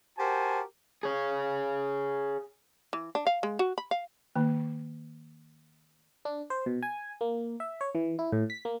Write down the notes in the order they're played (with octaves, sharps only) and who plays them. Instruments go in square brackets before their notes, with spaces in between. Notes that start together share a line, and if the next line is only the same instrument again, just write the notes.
[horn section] F#4 G4 A#4 C5 G#5 A5
[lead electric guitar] G#4 C#5
[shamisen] E3
D4
F5
G#3
F#4
B5
F5
[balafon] D#3 A#3
[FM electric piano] D4
C5
B2
G#5
A#3
E5
C#5
E3
E4
A2
B6
A#3